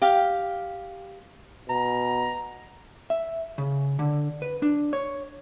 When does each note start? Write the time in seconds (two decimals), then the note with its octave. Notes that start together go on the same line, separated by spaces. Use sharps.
0.02 G4 F5
1.69 B2 A#5
3.10 E5
3.58 C#3
3.99 D3
4.42 B4
4.62 D4
4.93 C#5